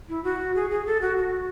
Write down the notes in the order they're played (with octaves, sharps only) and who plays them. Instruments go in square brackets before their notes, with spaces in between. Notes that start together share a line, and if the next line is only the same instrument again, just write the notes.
[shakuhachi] E4
F#4
G#4
G#4
A4
F#4
F#4